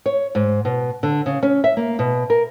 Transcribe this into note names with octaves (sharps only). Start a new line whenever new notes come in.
C#5
G#2
B2
D3
C#3
C#4
E5
A#3
B2
A#4